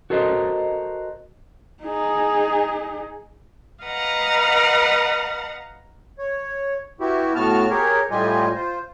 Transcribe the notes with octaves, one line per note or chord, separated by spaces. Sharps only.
F#4 A4 A#4 C5 D#5
D#4 G#4
B4 D#5 F5 F#5 A#5
C#5
B3 E4 F#4 G4
A2 B3 F#4 A5 F6
G4 G#4 A#4 C#5
A2 G3 F4 G4 D#5 G#5
F4 C5